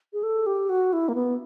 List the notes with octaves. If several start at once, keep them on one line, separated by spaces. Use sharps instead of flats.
G#4
A4
G4
F#4
E4
A#3
B3